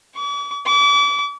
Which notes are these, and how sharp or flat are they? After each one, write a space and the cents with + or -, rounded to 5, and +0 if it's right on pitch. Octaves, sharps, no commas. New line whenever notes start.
D6 -45
D6 -35